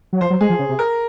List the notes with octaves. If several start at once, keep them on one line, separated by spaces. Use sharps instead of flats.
F#3
F3 C5
F#3
G#3 G#4
F3
C#3
C3
A#4